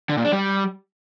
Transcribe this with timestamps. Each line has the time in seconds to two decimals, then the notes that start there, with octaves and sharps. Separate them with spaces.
0.09 D3
0.17 A#2
0.25 D4
0.32 G3